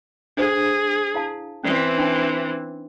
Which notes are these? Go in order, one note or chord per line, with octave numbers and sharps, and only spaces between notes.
D4 G#4 A4 C5
E4 F5 A5
E3 C4 C#4 D5
D4 D#4 G5